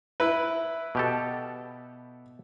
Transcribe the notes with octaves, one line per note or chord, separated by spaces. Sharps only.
E4 B4
B2 G4 A4